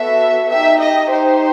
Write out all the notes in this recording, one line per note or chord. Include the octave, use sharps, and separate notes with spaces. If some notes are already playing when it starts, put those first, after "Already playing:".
Already playing: B3 F#4 A4 E5
D#4 G4 E5
D#5
D#4 G4 C5